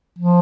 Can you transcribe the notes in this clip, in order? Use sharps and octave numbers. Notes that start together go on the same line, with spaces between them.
F3